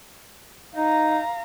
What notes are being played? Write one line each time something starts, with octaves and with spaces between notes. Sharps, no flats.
D#4 F5 A#5